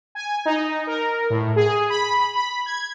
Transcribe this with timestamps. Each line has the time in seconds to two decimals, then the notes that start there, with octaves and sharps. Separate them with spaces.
0.15 G#5
0.45 D#4
0.87 A#4
1.30 A2
1.56 G#4
1.90 B5
2.35 B5
2.66 G#6